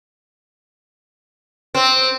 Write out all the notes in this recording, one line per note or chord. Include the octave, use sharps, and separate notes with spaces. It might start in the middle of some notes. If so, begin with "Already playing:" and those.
C4